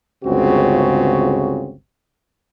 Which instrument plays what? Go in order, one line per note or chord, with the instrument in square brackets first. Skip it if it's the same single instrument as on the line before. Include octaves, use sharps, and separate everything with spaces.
[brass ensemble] G1 C#2 C#3 C4 F#4